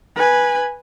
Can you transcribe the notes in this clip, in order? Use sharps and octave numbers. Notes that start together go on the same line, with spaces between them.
B4 G#5